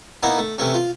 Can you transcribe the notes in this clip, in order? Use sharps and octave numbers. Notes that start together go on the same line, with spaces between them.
A#3 B3 D#4 E4
A3
C3 E3 A3 C#4
F4